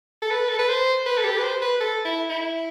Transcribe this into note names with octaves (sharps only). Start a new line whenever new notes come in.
A4
B4
A4
B4
C5
B4
A4
G4
B4
C5
B4
A4
E4
E4